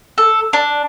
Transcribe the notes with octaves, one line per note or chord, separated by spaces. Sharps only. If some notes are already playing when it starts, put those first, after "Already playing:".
A4
D4